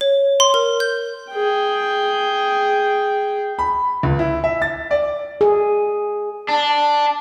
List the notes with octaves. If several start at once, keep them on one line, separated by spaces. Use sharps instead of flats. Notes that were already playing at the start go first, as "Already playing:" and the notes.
C#5
C6
A#4
G6
G#4 G5
B5
C#2
E4
E5
A6
D5
G#4
D4